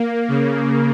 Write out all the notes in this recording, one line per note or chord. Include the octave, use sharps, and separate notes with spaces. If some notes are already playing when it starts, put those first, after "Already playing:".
Already playing: A#3
C#3